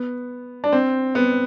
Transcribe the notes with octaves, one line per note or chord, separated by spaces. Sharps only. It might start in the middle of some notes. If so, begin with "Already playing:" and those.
Already playing: B3
D4
C4
B3